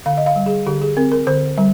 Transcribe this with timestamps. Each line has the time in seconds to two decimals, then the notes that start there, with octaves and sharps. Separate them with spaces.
0.06 D3 F5
0.17 D#5
0.26 F5
0.36 G3
0.46 G#4
0.67 D3 G4
0.82 G#4
0.97 C4 A#4
1.12 A#4
1.27 D3 C5
1.58 G3